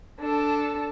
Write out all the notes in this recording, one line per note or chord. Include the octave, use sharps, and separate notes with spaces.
D4 A4